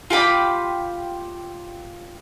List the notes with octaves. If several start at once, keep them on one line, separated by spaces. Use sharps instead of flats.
F4 G4 B5 D6